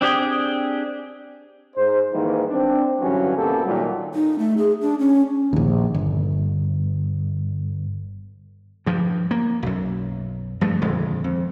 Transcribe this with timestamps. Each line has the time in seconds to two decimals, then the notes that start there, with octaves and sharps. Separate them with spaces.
0.01 C4 D4 G4 G#4 G5
1.76 G#2 C5
2.13 G#2 D#3 E3 G3 A#3
2.50 C4 D4
3.01 G2 D3 E3 F#3 C#4
3.36 C2 B2 A#3 G4 A4
3.66 A#2 D#3 F#3 G3
4.14 D#4
4.39 A3
4.58 G#4
4.81 D4
4.99 C#4
5.53 A#1 D#2
5.94 G1
8.86 G2 F3
9.31 A#3
9.63 B1 F#2
10.61 G2 F3 A3
10.82 D#1 F2 D3 G#3
11.24 F2